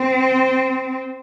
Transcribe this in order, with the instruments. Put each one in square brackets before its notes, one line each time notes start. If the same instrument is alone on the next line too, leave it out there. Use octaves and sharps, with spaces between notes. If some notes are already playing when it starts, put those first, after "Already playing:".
Already playing: [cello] C4